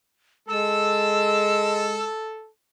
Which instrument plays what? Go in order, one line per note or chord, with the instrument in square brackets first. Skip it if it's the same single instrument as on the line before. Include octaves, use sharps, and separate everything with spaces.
[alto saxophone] G#3 [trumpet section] A4 [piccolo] E6